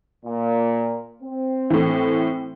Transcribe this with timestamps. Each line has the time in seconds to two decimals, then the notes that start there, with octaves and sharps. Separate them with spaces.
0.24 A#2
1.22 C4
1.70 A2 E3